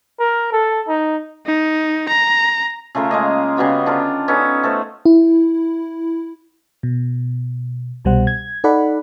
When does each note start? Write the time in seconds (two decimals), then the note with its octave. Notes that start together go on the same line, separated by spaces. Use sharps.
0.20 A#4
0.52 A4
0.88 D#4
1.46 D#4
2.09 A#5
2.95 C#3 A3 F4 A#4
3.11 G#3 A#3 D#5
3.57 C#3 G3 B3 F#4
3.86 D3 D4 F4 A#4
4.28 B3 C#4 D#4 A4
4.63 A3 A4 C5
5.05 E4
6.83 B2
8.05 C2 B2 G3 C5 F#5
8.27 G#6
8.64 D#4 A4 D5 F#5 B5